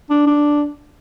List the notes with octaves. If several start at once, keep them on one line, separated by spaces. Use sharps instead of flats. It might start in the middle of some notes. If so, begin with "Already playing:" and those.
D4
D4